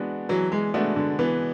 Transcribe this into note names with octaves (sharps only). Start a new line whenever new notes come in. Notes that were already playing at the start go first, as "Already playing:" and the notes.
Already playing: E3 G#3 B3 D4 F#4
E3 F#3
G#3
G#3 A3 B3 D4 F#4
D3
E3 B3